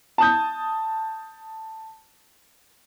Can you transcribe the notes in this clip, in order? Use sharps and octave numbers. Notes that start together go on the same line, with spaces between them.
A5 D#6 G6